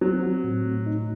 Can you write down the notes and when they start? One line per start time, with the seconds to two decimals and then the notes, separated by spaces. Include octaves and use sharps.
0.01 F#3 C4
0.23 F#4
0.44 A2
0.66 A3
0.86 D#4